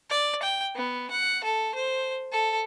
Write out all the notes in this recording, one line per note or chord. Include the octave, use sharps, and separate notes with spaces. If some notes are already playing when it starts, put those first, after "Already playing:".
D5
G5
B3
F#5
A4
C5
A4